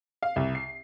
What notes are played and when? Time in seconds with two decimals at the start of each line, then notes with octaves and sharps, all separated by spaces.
0.23 F5
0.36 C2
0.55 C7